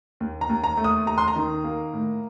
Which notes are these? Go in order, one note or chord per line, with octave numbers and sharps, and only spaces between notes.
D#2
A#5
D#2
A#5
A3
D#6
D#2 A#5
C6
A#5
D#3
A#3
A2